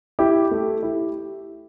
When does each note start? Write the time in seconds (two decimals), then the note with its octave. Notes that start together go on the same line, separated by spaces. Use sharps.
0.19 E4 G4
0.51 A3
0.83 E4 G4